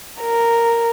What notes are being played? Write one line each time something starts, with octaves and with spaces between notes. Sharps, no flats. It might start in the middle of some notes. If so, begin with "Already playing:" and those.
A#4